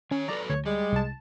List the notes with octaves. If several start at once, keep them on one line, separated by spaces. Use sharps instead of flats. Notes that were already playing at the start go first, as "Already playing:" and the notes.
D#3 C#4 C#5
F#3 A4 B4 D5 A#5
D2 C#5
G3 G#3
C2 A5